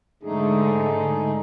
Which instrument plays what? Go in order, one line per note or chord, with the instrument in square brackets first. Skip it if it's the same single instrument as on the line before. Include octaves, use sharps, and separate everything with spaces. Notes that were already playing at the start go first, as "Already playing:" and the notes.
[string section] G#2 D3 [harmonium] A3 D#4 G#4